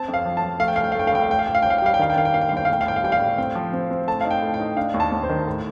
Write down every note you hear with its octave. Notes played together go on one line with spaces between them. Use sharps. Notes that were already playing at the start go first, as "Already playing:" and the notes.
Already playing: C4 A5
F2
F5
F3
A5
F3
A3 F5
G5
C2 F5
G5
F5
A3 G5
F5
C2 G5
F5
A1 G5
F5
A1 G5
F5
A1 G5
F5
G5
G3 F5
G5
D#3 F5
G5
D#3 F5
G5
A#3 F5
G5
G1 F5
G5
F5
A2 G5
F5
A1 G5
F5
G3 G5
F5
A2
C4 G5
F3
C4
C4
A2 A5
D#4 F5
G5
A2
G5
D#4
D4 F5
D#2
A5
D#2
C5
D#3
A2